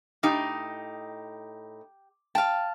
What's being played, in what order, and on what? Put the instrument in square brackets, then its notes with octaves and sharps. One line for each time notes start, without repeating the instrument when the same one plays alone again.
[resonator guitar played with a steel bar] A2 D#4 [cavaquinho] G4
[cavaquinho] F5 A5 [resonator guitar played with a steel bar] G5